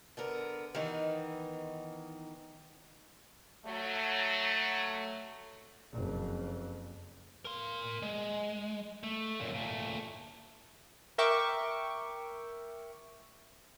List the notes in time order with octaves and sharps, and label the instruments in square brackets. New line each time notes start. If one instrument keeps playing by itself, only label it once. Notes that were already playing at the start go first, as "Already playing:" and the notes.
[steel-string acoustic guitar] D3 B3 A#4
D#3 E3 B3 D#4
[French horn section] F#3 A3
[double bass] F#1 F2
[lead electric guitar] A#4 C6
G#3
A3
F#2 A#2
A#2 A3
[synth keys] A#4 E5 G5 C#6 D6